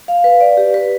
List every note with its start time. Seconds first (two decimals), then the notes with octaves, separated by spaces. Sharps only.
0.08 F5
0.24 B4
0.41 D5
0.57 G4
0.74 B4